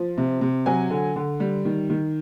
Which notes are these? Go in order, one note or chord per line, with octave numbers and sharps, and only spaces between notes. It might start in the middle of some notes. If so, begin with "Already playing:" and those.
Already playing: F3
C3
C3
F#3 G#5
D3
D3
G3
D#3
D#3